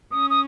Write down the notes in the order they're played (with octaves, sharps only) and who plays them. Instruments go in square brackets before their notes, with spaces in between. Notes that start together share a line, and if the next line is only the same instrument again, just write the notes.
[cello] C#4 [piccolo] D#6
[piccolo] D#6